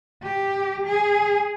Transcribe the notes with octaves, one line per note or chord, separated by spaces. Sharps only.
G4
G#4